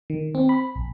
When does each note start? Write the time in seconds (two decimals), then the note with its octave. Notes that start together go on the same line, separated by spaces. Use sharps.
0.10 D#3
0.35 C4
0.49 B5
0.76 A#1